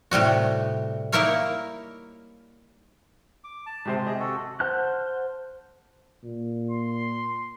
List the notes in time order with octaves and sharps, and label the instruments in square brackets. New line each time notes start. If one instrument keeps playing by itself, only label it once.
[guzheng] A2 C3 G3 F#4
A#3 D#4 E4 A#4 C#5 F5
[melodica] D6
A5
[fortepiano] G#2 C3 C5
[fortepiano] C3 D#5 [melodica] G#4
[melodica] F#4 A4
[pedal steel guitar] C5 F#5 A5 F6 F#6
[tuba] A#2
[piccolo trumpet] C6